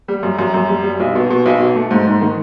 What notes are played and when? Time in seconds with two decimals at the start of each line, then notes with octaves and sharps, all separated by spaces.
0.08 G3
0.23 F#2
0.39 F#2
0.54 F#2
0.69 G3
0.84 G3
1.00 B1
1.15 B2
1.30 B2
1.46 B1
1.60 B2
1.76 A3
1.91 G#2
2.07 G#2
2.21 D#3